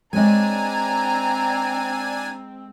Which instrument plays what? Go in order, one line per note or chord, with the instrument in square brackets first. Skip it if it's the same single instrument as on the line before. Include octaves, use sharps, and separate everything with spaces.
[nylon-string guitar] G#3 C#5 D#5 [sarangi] C4 [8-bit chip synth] D4 G#5 [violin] A#5